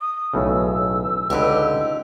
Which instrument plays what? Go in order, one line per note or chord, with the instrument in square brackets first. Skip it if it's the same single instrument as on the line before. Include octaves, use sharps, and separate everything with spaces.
[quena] D#6
[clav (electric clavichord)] B1 A2 C#3 [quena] E6
[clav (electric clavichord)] C#2 D3 B4 [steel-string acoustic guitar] D#4 G4